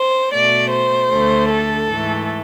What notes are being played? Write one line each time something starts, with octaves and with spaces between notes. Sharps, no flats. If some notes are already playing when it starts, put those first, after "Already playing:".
Already playing: C5
B2 A3 D5
C5
D2 D3 A3
A4
G#2 E3 A3